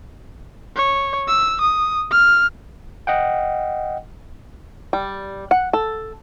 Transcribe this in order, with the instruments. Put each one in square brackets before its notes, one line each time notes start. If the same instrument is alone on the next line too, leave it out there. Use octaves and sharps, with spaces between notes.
[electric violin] C#5
E6
D#6
F6
[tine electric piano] D#5 F#5 G5
[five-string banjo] G3
F#5
A4